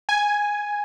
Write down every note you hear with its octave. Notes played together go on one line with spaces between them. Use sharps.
G#5